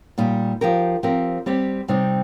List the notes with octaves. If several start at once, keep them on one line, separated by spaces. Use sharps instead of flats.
A#2 G3 D#4 G4
F3 D#4 G4 A#4
F3 C4 G4 A#4
G3 C4 G4
C3 G3 C4 D#4